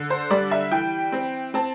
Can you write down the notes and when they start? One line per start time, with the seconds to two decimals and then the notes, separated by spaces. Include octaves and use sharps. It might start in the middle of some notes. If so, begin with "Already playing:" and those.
Already playing: D3
0.10 C5
0.30 G3 D5
0.51 E5
0.72 E3 G5
1.12 C4
1.54 C4 A5